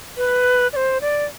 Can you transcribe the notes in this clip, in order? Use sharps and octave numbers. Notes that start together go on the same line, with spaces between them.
B4
D5
C5
D5